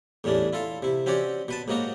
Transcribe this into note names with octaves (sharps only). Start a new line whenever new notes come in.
E2 A2 G3 C#4 D4
E4 F4 A4 F5
C3 E4
C4 C#4 F#4 G4 C#5 D5
B2 B4 A5
G#2 F#3 A#3 D#4 F#4